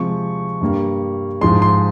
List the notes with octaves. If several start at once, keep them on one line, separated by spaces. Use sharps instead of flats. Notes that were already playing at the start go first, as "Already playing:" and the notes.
Already playing: C3 F3 G#3 C#6
G2 G3 A#3
G#2 F3 G#3 C6
C6